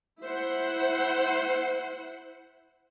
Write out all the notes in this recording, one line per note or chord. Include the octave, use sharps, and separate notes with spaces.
E4 C5 F#5